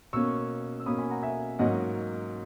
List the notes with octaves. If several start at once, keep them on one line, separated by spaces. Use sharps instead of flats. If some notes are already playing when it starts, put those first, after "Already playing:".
B2 A#3 C#4 C#6 E6
E6
B2 A#3 C#4 B5 D#6
G#5 B5
F#5 A#5
E5 G#5
G#2 F#3 A#3 C#4 D#5 F#5